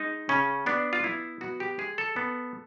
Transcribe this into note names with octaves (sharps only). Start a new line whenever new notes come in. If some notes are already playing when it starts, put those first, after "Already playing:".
Already playing: G#3 D#4
C#3 C#4
B3 D4
F4
B3 E4
B3 F#4
G4
G#3 G#4
A4
B3